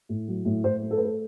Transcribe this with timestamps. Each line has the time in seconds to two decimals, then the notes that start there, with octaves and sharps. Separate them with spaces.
0.09 A2
0.28 F#3
0.45 A2
0.64 A2 C5
0.82 A3
0.91 A4
0.98 A3 B4
1.05 A4